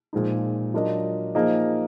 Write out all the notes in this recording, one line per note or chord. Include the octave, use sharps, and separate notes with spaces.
A#2 F3 G#3 D#4
F#3 D4 F4 A#4 D#5
F3 A#3 D#4 G#4 D#5